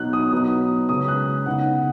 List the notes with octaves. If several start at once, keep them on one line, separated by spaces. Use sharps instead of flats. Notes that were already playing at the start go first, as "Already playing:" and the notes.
Already playing: B2 F#3 D#4 F#6
D#6
B2 F#3 B3 D#4 D#6
C#3 G#3 C#4 D#6
F#6
C#3 B3 D#4 F#5